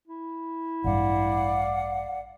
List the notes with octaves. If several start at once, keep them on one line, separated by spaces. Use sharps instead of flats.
E4
A1 G2 D5 F5 F#5